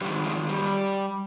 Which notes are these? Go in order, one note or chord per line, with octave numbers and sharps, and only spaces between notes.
G#2 D#3 G3
F3 G#3
G3